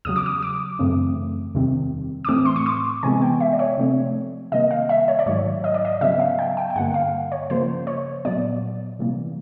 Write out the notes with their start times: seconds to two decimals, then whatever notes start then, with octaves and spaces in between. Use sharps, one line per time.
0.05 E2 C#3 F#3 D#6
0.16 D6
0.26 D#6
0.42 D6
0.79 F#2 C#3 E3 A3 C4
1.55 E2 C3 D#3 G3 C4
2.25 D6
2.29 A2 E3 A3 C4 D#6
2.45 C6
2.56 C#6
2.66 D6
3.03 C3 E3 G#3 B3 G#5
3.22 G5
3.40 E5
3.53 D5
3.59 C#5
3.78 C3 F3 A3 C4
4.52 C3 D#3 G3 A#3 D#5
4.71 F5
4.89 E5
5.08 C#5
5.19 D5
5.26 G#2 D#3 F#3 C#5
5.64 D#5
5.74 D5
5.85 D#5
6.01 C#3 F#3 B3 E5
6.20 F5
6.39 G5
6.57 G5
6.70 G5
6.76 G2 D3 G3 A#3 F#5
6.94 F5
7.32 C#5
7.50 C#3 F3 A#3 C5
7.87 C#5
8.25 A#2 F#3 B3 D5
8.99 C3 E3 G3 A#3